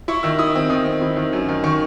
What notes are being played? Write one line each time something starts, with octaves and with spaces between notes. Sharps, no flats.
E4 C#6
D#3 E6
E4 D#6
C4
D#3 D#6
C4
E4
D#3
F#2
D#3
D#3 C#6